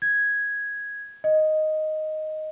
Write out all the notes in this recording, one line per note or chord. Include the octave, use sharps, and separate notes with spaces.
G#6
D#5